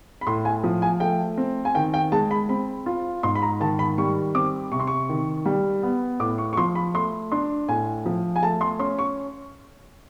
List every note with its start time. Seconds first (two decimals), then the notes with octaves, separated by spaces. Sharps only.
0.21 B5
0.27 A2 C6
0.45 G#5
0.64 F3
0.82 G#5
1.00 A3 G5
1.38 C4
1.65 G#5
1.75 D#3 G5
1.94 G5
2.12 G#3 A5
2.31 B5
2.49 C4 B5
2.86 F4
3.23 G#2 C6
3.35 B5
3.42 A#5
3.60 D#3 A5
3.79 B5
3.98 G3 C#6
4.35 C4 D6
4.72 C3 C#6
4.80 C6
4.87 C#6
5.09 D#3
5.46 G3
5.83 B3
6.20 A2 D6
6.38 C#6
6.53 C#6
6.57 F3 C6
6.75 B5
6.94 A3 C6
7.32 D4 C6
7.69 A2 G#5
8.06 F3
8.36 G#5
8.42 A3 A5
8.61 C6
8.79 C#4 C6
8.99 C#6